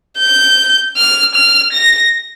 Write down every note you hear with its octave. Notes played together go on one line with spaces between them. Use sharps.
G6
F6
F6
A#6